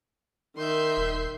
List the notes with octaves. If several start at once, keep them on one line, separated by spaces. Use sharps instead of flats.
D#3 E5 C6 G6
D#1